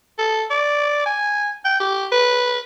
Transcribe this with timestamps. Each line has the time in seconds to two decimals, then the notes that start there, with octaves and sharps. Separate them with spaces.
0.19 A4
0.50 D5
1.06 G#5
1.65 G5
1.80 G4
2.12 B4